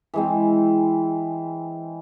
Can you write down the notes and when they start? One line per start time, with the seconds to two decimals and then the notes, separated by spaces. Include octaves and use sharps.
0.14 E3 G#3 C4